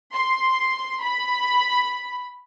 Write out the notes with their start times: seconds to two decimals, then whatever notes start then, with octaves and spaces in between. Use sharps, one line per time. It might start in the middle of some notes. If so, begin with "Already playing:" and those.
0.14 C6
1.02 B5